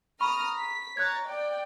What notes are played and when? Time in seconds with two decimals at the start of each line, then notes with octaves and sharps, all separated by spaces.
0.21 A#5 B5 C#6 D#6 F6
0.56 B6
0.97 C#5 A#5 F#6 G#6 A6
1.27 D5 G5